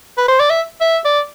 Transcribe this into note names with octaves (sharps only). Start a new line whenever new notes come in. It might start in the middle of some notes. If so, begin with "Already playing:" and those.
B4
C5
D5
E5
E5
D5